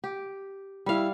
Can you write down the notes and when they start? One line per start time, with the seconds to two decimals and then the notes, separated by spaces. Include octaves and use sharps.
0.04 G4
0.86 G3 E4 F5